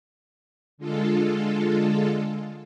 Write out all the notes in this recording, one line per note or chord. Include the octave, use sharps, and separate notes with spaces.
D3 G#3 F4 A4